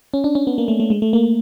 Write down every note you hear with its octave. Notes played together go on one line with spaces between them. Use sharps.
C#4
D4
C#4
B3
A#3
A3
A3
G#3
A3
A#3